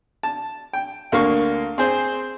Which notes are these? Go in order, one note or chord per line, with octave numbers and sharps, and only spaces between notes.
A5
G5
D2 A#3 F5 C#6
C4 G#4 C5